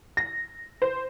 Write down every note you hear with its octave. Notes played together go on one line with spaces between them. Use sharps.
A#6
C5